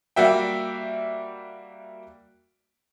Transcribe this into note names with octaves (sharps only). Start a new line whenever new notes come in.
G3 A#3 F#4 E5 G5